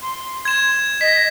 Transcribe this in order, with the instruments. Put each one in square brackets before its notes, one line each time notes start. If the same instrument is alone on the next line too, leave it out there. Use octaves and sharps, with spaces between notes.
[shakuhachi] C6
[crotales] G#6 E7
[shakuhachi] D#5 [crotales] B6